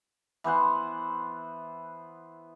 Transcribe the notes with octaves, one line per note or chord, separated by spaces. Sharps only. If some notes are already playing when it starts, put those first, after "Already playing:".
E3 B3 C5 F#5